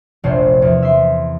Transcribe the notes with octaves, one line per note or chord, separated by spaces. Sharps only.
F1 A#1 C5
E2 F3
E5 C6